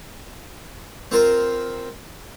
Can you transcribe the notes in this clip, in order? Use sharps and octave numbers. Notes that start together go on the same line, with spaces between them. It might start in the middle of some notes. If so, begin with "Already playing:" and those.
C4 F4 A#4 C5